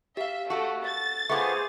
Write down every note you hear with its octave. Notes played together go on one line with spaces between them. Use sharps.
G4 E5 F5
A3 F#4 A4
A6
A3 B3 F4 G#4 C5 C#6 D6